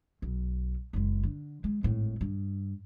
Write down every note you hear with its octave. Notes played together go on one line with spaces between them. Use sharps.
B1
F#1 G#3
D3
G#3
G#1 A2
G2